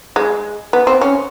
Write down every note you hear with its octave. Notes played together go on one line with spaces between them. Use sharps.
G#3
B3
C4
C#4